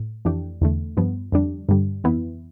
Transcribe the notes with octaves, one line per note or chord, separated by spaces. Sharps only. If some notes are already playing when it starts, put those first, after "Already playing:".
Already playing: A2
F2 E3 A3 D4 G4
E2 D3 A3
G2 F3 B3
F2 D3 G3 D4
G2 D3 G3
F2 E3 B3 E4